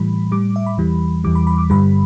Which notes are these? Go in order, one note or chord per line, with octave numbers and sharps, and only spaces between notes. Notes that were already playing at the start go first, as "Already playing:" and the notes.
Already playing: A2 E3 G3 B5
A2 G3 D6
E5
B5
E2 E3 G3
E2 E3 G3 D6
B5
B5
D6
G2 D3 G3 B5